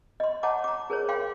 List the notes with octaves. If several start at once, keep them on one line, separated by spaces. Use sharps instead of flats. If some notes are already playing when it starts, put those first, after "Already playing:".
D#5 C6
C#5 D#5 F#5 A5 A#5 D6
A#5 D6
G#4 A#4 C5 C#5
F5 G5 C6 D6